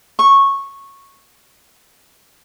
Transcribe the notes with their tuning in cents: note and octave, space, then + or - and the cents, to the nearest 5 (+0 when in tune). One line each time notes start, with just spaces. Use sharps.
C#6 -10